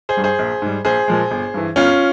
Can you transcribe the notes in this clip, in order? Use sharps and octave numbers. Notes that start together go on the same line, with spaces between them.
G#4 C5
G2 G3
G#4 C5
A#1
G#2 G3
A#1 G#4 C5
A#2 F3 G#3
G1
G2 E3
G1 C#4 F4